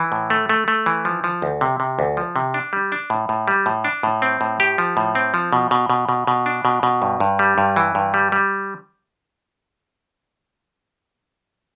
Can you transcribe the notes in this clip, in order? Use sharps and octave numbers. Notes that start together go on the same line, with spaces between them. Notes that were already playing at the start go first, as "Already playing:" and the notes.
Already playing: E3
A2
A3
A3
A3
E3
F3
F3
D2
C3
C3
D2
F3
C3
D4
G3
D4
A2
A2
G3
A2
D4
A2
C4
A2
G4
F3
A2
C4
F3
B2
B2
B2
B2
B2
D4
B2
B2
G2
G2
G3
G2
E3
G2
G3
G3